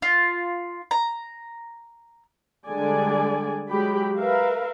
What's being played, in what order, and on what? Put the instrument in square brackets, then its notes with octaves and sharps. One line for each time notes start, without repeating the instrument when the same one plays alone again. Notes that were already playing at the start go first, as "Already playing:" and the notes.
[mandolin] F4
A#5
[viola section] D3 G3 G#3 D5 G#5
F#3 G#3 G4 B5
A#4 B4 E5 F5